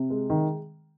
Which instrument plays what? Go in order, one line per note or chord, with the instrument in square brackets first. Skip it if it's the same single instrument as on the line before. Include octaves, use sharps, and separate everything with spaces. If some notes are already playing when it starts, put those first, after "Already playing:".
Already playing: [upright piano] C3
G#3
D#3